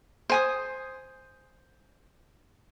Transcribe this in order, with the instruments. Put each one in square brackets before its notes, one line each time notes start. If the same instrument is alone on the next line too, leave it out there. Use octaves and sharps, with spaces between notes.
[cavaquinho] C5 G#5 D#6